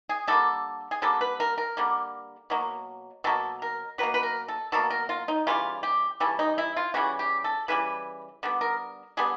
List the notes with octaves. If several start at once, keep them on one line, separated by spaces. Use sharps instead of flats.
G#4
D3 G3 A#3 A4
G#4
D3 G3 A#3 A4
B4
A#4
A#4
D3 G3 A#3
B2 F#3 A#3
B2 F#3 A#3 A4
A#4
B2 F#3 A#3 B4
B4
A#4
A4
B2 F#3 A#3 A4
A#4
F4
D#4
C#3 E3 G3 F4
G4
C#3 E3 G3 A4
D#4
E4
F4
C#3 E3 G3 F#4
G4
A4
C#3 E3 G3 B4
D3 G3 B3
A#4
D3 G3 B3 G#4